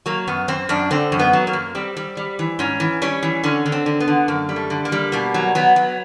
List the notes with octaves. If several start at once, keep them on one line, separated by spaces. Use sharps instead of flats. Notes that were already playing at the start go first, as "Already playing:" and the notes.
F#3 A#3
F#2 B3
F#2 C4
F#2 D4
D3 C4
F#2
B3
F#3
A#3
F#2
G3 C4
G3
G3
E3
G#2 C#4
E3
G3 C#4
E3
D3 C#4
D3
C4
D3
B3
D3
F#2 A#3
G3
A3
D3
A#3
G3
B2 A#3
F#3
F#3 B3
F#3